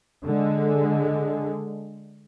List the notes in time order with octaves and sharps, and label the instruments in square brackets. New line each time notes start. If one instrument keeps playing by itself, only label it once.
[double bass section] D3 G#3